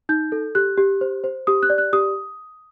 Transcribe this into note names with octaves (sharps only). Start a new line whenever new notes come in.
D#4 G6
A4
G4 F#6
G4
C5
C5
G4 D#6
F#6
D5
F#6
G4 D#6